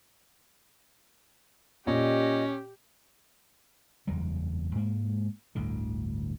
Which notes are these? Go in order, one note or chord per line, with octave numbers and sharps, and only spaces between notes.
A#2 C#4 G4 D#5
F#1 E2 F#3 G3
G#2 G#3 A#3
G1 D2 A2 D3